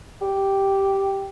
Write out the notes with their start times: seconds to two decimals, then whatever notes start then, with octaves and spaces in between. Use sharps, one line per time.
0.22 G4